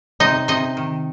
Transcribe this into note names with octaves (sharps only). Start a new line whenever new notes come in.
C3 D#4 D#5
C3 D#4 D#5
D#3